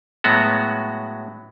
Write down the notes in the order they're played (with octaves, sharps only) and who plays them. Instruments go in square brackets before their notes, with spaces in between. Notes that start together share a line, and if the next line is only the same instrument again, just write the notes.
[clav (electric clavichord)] A2 F#3 G#3 B3 F#4